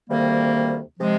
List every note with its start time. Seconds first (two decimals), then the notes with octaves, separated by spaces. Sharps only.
0.09 D2 C3 D#3 G3 A#3
0.98 C3 F3 G#3